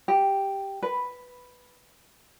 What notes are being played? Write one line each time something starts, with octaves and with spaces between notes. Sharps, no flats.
G4
B4